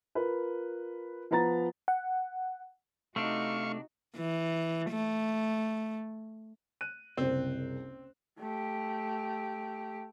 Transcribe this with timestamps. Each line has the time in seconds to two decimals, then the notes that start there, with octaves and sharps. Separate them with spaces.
0.15 F4 A#4 B4
1.31 F3 B3 A#5 A6
1.88 F#5
3.16 C3 A3 D4 D#4 F#4 F5 C#6
4.16 E3
4.91 A3
6.81 F#6 D#7
7.17 F#1 C2 C4
8.39 A3 G4